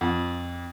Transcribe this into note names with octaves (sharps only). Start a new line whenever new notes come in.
F2